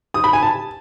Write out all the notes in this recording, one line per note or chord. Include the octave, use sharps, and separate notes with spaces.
D#6
B5
G#5
A5